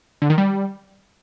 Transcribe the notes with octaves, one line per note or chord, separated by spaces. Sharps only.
D3
D#3
G3